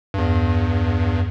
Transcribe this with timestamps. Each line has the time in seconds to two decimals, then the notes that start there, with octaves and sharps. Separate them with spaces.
0.14 E2 G2